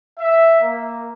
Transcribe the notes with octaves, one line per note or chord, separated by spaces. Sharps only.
E5
A#3